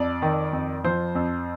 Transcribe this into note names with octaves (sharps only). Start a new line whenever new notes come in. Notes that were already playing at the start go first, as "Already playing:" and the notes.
Already playing: F2 D5
D#3
F2
F3 C5
F2